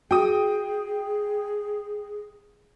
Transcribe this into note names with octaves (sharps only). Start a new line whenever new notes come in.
F#4 G#4 G5 D#6